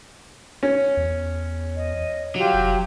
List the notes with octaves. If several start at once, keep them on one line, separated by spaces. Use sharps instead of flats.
C#4
E2
D#5
F#3 F4 G4
F1